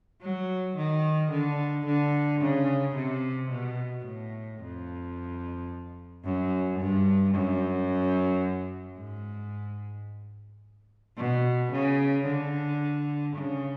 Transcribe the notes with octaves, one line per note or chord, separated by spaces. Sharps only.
F#3
D#3
D3
D3
C#3
C3
B2
A2
F2
F#2
G2
F#2
G#2
B2
C#3
D3
C#3